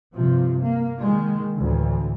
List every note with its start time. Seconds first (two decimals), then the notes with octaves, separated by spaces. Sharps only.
0.14 G2 C3 F3
0.61 A#3
1.02 D#3 G#3
1.58 D2 A2 E3